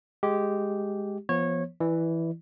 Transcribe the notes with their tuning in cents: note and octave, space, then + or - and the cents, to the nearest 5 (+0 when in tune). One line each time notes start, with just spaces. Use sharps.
G#3 +0 G4 -10
F3 -30 B3 -25 C#5 -20
E3 +0 E4 +0 D5 +25